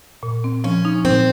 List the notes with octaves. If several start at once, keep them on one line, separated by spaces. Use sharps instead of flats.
A#2
C4
F3 C#4
D#4
A#2 C4